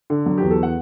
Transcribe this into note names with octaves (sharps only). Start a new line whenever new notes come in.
D3
F#3 F#4
E2 G4
A4
F#5